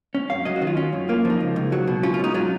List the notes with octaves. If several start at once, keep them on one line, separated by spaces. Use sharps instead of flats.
C#4
F#2 F5
F#3 D#5
F#4
D#3
F4
C#4
F#2
A#3 F4
F3
D#4
C#2
C#2
F#3
B2
C#4 F4
F4
G#2 D#4
F#3 F4